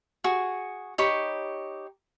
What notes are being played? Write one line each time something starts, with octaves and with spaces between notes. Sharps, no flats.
F#4 G#4
D#4 G4 C#5 B5